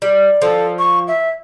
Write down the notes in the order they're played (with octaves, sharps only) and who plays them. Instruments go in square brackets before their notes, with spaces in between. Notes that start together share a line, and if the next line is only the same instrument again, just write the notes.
[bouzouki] G3
[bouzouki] F3 [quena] A4
[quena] C#6
E5